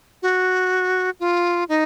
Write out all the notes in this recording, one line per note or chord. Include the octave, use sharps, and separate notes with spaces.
F#4
F4
D#4